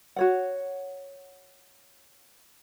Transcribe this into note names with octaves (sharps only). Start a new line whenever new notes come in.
F#4 C#5 F#5